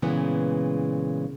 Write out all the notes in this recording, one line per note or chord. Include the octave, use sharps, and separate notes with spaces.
A#2 C#3 E3 G#3 B3